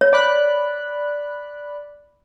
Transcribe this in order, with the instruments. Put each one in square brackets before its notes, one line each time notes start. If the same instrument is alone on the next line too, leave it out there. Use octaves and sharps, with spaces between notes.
[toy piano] C#5
[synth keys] D5 B5 F#6